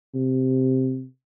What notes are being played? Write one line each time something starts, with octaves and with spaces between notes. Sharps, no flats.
C3